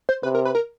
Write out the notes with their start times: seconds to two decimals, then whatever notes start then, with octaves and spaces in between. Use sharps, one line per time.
0.09 C5
0.23 C3 B4
0.35 A#4
0.45 B4
0.55 A#4